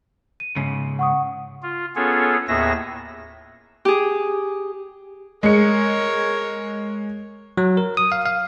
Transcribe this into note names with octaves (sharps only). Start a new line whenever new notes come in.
D#7
G#2 C#3
F#5 C#6 D#6
F4
B3 C#4 F4 G#4 A4 C#5
D#2 A2 B3 G#4 E5 A#6
G4 G#4
G#3 A#4 C#5 C#7
F#3
A#4
D#6
F5
F5